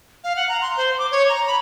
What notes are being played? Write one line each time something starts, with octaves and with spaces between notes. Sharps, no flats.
F5
F#5
A#5
C6
C5
D6
C#5
A#5
B5